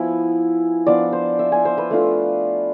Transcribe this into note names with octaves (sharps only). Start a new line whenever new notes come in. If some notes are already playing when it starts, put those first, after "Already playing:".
Already playing: F3 B3 E4 G#5 B5
F3 B3 D4 F4 D5
C5
E5
G#5
C5
B4
A3 D4 F4